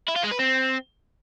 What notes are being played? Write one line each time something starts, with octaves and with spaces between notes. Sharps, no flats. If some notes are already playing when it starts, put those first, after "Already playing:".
E4
F4
G#3
B4
C4